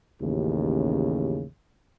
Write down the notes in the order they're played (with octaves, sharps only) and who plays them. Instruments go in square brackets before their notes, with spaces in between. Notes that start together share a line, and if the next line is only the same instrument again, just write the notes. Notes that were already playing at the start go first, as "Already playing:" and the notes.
[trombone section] A1 D#2 C#3